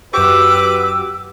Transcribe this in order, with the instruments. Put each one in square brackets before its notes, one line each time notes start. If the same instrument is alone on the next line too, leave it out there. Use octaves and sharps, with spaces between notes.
[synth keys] F#2 F#4 G4 [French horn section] B4 [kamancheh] D6 [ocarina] E6